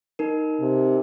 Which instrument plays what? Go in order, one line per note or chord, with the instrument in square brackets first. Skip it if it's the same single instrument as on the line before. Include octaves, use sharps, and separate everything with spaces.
[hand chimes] D#4 A#4
[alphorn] C3